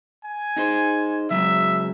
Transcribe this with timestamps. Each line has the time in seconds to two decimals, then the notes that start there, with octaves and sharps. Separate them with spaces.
0.25 G#5
0.57 D#4 G#4 C5
1.30 C#3 F#3 G#3 E5